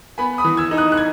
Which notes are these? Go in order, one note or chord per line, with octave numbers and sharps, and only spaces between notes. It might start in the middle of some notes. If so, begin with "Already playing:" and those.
B3 G#5 B5
B5 D#6
E3
E6 G#6
D#4
D#6 F#6
F#6
G#6